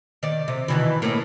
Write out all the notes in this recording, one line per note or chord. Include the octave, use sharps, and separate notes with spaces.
D#3 D5
C3
B2 D#3 E3
A2 A#3 C#4